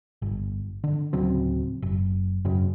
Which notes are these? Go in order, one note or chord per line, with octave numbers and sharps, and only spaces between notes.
G1
D3
D1 C#3 F#3 C4
F#1
F#2 C#3